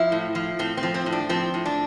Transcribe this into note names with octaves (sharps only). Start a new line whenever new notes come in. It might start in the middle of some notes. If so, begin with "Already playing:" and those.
Already playing: F3 E4
A2
F3
A2 C4
C4
F3
C4
A2
D4
F3 C4
A2
D4